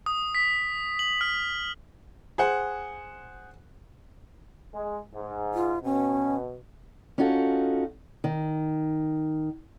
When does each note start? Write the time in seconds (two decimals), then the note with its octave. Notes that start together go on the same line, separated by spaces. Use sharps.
0.06 D#6
0.35 B6
0.99 F#7
1.21 F6
2.38 G#4 C5 F#5
4.74 G#3
5.14 G#2
5.54 F4
5.84 B2 C#4
7.18 C#4 D#4 F4 F#4 A4
8.24 D#3